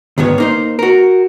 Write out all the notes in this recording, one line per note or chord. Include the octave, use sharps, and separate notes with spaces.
D2 G#2 D#3 B3 C#5
A#3 D#4 C5
F#4 A#4